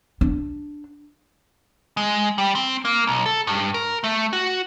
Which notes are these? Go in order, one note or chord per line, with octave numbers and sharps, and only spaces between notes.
D4
G#3
G3
C4
A#3
B1
A4
G2
A#4
A3
F#4